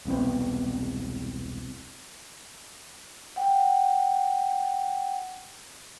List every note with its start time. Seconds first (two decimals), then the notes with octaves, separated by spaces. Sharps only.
0.05 E1 C2 B3 C4
3.36 F#5 G5